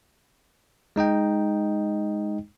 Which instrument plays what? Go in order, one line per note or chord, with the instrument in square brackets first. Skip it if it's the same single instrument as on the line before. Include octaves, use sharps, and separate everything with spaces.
[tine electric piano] G#3 D#4 D#5 G5